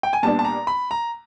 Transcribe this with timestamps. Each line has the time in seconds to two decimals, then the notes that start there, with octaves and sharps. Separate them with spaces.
0.03 G5
0.13 G#5
0.23 A#2 G3 B3 D4 A5
0.39 A5
0.45 A#5
0.67 B5
0.91 A#5